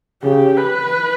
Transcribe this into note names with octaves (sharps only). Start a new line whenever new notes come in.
C#3 G4
B4